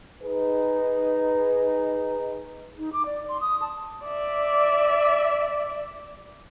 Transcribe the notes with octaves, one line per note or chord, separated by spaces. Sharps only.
D#4 G#4 B4
D#4
D6
D5
C6
D#6
A5
D5 E5